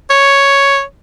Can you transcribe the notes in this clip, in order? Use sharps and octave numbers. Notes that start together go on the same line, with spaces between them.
C#5